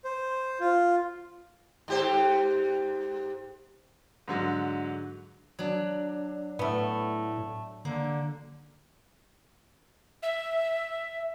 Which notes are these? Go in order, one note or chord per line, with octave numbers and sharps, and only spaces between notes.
C5
F4
G#2 G4 C5
G#2 D3 F#3
F#3 D4
A2 A3 B3
D3 A#3
E5